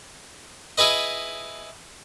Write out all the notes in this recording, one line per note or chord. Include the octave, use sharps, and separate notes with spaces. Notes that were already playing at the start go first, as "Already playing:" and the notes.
E4 G#4 B4 D#5